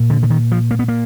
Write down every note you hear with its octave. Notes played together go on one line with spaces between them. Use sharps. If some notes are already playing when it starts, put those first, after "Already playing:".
Already playing: A#2
D3
D3
D#3
F3
A#3
B3
A#3